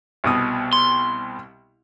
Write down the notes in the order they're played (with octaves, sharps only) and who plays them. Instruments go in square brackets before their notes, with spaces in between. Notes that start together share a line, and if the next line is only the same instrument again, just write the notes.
[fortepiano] C2 B2 D#6
[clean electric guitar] C6